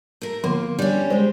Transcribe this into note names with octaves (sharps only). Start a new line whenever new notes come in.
A3 A#4
D3 F3 A#3 B3 F4
G3 C#4 D4
G#3 C5 D5